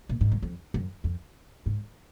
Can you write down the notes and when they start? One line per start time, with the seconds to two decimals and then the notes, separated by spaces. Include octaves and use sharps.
0.09 A#2
0.21 G#2
0.32 F#2
0.42 F2
0.74 F#2
1.04 F2
1.66 G#2